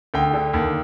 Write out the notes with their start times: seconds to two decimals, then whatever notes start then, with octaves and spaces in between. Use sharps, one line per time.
0.14 D2 G5
0.34 D3
0.54 D#2